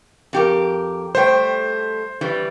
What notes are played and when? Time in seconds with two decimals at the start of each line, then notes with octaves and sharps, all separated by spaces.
0.33 F2 G4 A#4
1.15 G3 A3 C5 G5
2.21 E3 G3